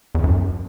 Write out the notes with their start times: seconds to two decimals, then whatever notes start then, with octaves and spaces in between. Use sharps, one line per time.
0.15 E2
0.24 F#2